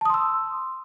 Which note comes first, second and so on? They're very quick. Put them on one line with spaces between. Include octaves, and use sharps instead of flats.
A5 D#6 C6 E6